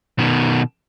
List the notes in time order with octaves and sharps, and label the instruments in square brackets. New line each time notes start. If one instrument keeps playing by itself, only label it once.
[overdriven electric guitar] B2 D#3